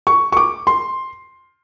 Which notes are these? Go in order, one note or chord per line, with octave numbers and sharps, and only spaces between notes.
C#6
C#6
D6
C6